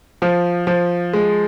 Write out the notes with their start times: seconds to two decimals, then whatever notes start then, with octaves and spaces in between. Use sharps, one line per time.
0.22 F3
0.67 F3
1.13 G#3